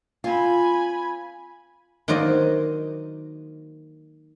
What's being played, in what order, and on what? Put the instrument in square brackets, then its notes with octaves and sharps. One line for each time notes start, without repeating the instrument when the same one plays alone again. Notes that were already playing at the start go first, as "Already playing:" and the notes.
[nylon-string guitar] C4 F4 [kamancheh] G#5 B5
[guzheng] D#3 F#3 A#3 C5 D5 D#5